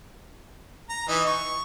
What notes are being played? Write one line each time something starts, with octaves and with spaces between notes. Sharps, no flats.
A#5
E3 D#4
C#6